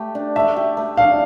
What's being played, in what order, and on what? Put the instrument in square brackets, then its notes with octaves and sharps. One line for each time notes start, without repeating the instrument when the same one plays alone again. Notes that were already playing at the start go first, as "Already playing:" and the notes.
Already playing: [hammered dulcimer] A3 G4
D4
[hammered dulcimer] A3 [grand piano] E5
[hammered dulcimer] G4
A3
[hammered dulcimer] D4 [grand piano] F5